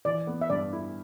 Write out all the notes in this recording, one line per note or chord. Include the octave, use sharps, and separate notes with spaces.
E3 D5
B3
E5
G2 D5
E4